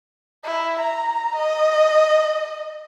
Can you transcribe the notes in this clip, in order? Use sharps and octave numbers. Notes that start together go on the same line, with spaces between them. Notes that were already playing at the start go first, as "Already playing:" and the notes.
E4
A#5
D#5